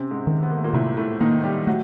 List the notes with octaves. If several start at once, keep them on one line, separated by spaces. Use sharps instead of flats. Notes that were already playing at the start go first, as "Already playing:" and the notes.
Already playing: C3 C4 C#4
G#2 G#3
D#3
B3
A#3
A3
A#2 A#3
A2 C3 A3
A2 A3
D#3 A#3 D#4
G3 G4
F#3 A3 F#4